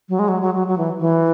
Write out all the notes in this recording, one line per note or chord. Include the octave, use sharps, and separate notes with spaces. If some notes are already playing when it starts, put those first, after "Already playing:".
F#3
G#3
F#3
F#3
F#3
F#3
E3
E3